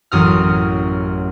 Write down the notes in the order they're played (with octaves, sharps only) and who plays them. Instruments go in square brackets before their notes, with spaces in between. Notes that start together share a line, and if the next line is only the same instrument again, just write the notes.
[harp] A1 F#2 D#6 F6